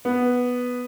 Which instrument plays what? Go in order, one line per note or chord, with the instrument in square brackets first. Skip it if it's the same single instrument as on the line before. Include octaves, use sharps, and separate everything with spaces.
[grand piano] B3